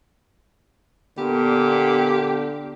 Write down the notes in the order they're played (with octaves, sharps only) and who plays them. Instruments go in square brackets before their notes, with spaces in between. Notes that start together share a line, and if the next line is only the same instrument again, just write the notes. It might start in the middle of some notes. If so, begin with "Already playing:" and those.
[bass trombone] A#2 [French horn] D3 [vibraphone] B3 [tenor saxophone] G4